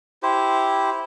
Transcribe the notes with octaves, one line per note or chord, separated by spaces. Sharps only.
E4 G4 C5